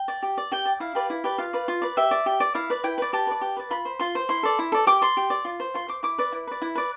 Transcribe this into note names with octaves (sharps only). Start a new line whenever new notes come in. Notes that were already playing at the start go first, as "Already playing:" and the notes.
Already playing: G5
D5
G4
D5
G4 G5
D5
E4 F5
G4 B4 D5
E4
G4 B4 D5
F4 F5
B4 D5
F4
B4 D5
G4 E5
D5
G4
D5
E4 F5
B4 D5
E4 G5
B4 D5
G4 A5
B4 D5
G4
B4 D5
F4 B5
C5
F4 C6
C5
E4 C6
A4 D5
E4
A4 D5
G4 D6
D5 C6
G4
D5
F4
C5
F4 C6
C5 D6
E4 D6
B4 D5
E4
B4 D5
E4
B4 D5